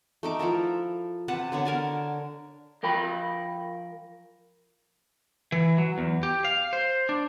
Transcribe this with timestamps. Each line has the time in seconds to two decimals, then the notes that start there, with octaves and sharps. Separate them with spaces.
0.23 A3 D#4 D6
0.39 F3 E4 A4 A#4
1.28 C3 B4 F#5 A5
1.52 D3 B3 C#5
1.65 A#4 G#5 A5
2.83 F3 A#4 G5 B5
5.52 E3
5.78 F#3
5.98 E2
6.23 G4
6.45 F5
6.73 C5
7.09 D4